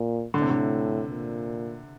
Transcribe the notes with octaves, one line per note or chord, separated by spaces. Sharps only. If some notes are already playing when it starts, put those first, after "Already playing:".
Already playing: A#2
A2 D3
C3
D3
A#2